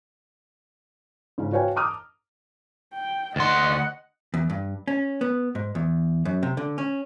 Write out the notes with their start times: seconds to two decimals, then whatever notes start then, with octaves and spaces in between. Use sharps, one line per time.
1.38 G#2 C#3 C#4
1.52 F#4 B4 C#5 F5 G5 G#5
1.75 A5 A#5 D6 D#6 F6
2.94 G5
3.36 D2 D#5 F#5 C6
4.34 E2
4.50 G2
4.88 C#4
5.21 B3
5.55 G#2
5.75 E2
6.25 F#2
6.43 C3
6.57 D3
6.78 C#4